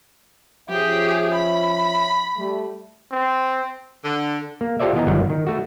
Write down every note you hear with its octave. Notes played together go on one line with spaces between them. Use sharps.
F3 C#4 G4 G#4 E5
B5
G3 A3
C4
D3
A#3
F4 G4 A4 C5 D5 E5
E3 B3 D#5 G#5 A#5
G1 D#3 F#3 G3 F#5
D#3
A3 F#4